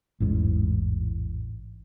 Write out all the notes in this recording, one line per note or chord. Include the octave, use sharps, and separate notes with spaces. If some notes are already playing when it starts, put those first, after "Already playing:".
A1 E2 G#2